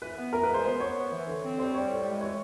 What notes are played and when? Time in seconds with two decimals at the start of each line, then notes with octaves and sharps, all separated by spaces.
0.02 E3 B4
0.17 B3
0.33 E3 A#4
0.43 B4
0.49 G#3
0.54 C5
0.64 B3 C5
0.79 B3 C#5
0.96 B3
1.12 E3
1.27 D3
1.43 C4
1.58 G3 C5
1.74 G3 C#5
1.89 A2
2.05 G#3
2.21 E3 C#5